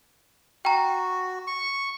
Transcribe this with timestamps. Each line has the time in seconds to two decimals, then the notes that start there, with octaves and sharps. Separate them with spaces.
0.65 F#4 G5 A#5
1.47 C#6